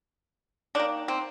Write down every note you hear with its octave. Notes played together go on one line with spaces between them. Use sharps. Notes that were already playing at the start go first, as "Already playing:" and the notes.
D#3 A#3 D4
C4